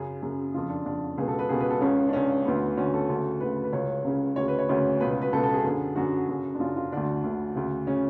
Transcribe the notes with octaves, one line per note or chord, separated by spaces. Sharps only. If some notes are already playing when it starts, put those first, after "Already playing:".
Already playing: F#2 C#3 G#4
F#2 C#3
F2 C#3 F4
D4
F2 C#3 D4
C#2 B2 G#4
A4
B4
C#2 B2 G#4
B4
A4
C#2 C#3 C#4
D4
C#2 C#3 C#4
D2 D3 B3
D2 D3 C#4
A4
D2 C#3
D2 C#3 B4
B4
C#2 C#3 C#5
C#2 C#3
D2 C#3 C#5
B4
C#5
D2 C#3 C#5
C#2 B2 B4
B4
B4
C#2 B2 A4
A4
G#4
F#2 D3
F#2 D3 F#4
F#2 C#3
D4
F#2 C#3 F4
F4
D2 D3 D4
D2 D3
D2 C#3
C#3 C#4